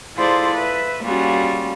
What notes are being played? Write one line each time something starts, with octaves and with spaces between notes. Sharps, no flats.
E4 F4 G#4 A4 C5 D5
B4 E5
G3 A#3 C#4 F4 F#4 G#4